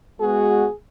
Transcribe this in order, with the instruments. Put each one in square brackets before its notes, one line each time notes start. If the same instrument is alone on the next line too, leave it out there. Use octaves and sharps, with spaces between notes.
[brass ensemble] G#3 B3 F#4 [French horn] G#4